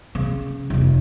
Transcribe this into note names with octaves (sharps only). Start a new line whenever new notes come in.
C#3
F1 E2